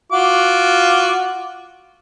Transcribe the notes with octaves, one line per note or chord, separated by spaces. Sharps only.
F4 F#4 D6